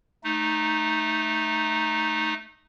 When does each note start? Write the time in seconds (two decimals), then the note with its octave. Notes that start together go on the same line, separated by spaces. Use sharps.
0.24 A3 D#4